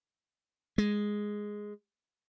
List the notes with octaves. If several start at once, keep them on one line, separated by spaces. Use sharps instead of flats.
G#3